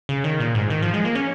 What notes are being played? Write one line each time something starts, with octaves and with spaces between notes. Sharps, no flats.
C#3
D#3
A#2
G#2
D#3
F3
G#3
A#3
C#4